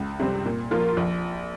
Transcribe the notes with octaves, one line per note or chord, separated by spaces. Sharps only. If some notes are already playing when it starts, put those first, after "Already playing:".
Already playing: C#2
C3 G3 C4
A#2
F3 A#3 F4 A#4
A#1